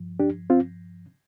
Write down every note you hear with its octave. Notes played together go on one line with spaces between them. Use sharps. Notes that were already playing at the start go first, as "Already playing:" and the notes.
Already playing: G2 F3
D4 G4
C4 F4